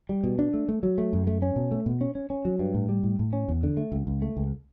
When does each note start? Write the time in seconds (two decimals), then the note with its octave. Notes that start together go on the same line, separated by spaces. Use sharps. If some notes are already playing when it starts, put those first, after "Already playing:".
0.09 G3
0.24 B2
0.39 D4
0.54 A3
0.69 A3
0.83 F#3
0.98 A3
1.13 F#2
1.27 A3
1.42 C#4
1.56 B2
1.71 A3
1.86 B2
2.01 C#4
2.15 C#4
2.30 C#4
2.45 F#3
2.59 G2
2.74 A2
2.89 G3
3.03 A2
3.19 A2
3.33 C#4
3.49 E2
3.63 D3
3.77 A3
3.92 C#2
4.07 C#2
4.22 A3
4.37 C#2